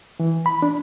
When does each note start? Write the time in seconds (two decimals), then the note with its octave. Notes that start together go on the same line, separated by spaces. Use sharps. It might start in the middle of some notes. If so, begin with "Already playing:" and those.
0.20 E3
0.46 B5
0.62 D4